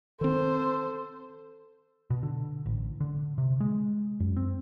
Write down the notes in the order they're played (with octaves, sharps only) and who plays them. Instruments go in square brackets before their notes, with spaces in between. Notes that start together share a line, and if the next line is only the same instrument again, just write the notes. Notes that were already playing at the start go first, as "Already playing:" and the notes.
[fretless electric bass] D#3 C4 [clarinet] A4 [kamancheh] C5
[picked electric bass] B2
D3
A1
D3
C3
G#3
F#2
C4